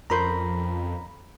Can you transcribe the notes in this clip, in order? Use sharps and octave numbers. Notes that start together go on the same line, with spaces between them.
F2 C#4 A#4 C5 A#5 B5